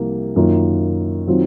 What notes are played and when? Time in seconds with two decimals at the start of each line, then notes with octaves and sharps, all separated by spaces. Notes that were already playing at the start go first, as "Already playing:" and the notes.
Already playing: C2 C3 F3 A#3
0.36 F#2 D#3 A#3 F4
1.27 D#3 F#3 C4 F4